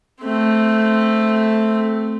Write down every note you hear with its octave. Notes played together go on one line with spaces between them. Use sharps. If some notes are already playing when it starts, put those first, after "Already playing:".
A3 C4